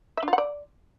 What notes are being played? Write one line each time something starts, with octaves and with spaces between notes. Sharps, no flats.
E5
D4
F4
F#5
D5